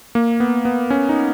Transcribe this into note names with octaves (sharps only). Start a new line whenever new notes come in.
A#3
B3
B3
C#4
D#4